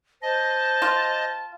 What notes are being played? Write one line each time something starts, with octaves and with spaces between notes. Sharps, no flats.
C5 D#5 A5
F4